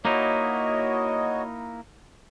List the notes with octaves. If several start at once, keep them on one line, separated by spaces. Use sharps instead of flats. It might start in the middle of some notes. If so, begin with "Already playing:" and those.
A#3 D#4 E4 F#4 C#5 D#5